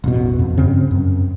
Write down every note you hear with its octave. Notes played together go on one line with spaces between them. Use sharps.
E1 A1 B2
F2
G2 C#3 C4
F#2